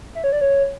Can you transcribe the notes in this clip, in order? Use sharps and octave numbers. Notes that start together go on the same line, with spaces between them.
E5
C#5
D5
C#5